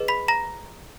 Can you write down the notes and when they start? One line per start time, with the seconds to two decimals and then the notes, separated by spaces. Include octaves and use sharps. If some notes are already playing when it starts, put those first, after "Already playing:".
Already playing: G#4 B4 D#5
0.08 B5 B6
0.28 A#5 A#6